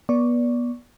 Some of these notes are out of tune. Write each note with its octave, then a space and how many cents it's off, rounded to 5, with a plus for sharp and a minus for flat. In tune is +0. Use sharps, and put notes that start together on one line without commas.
B3 -30 D5 -15 C#6 -5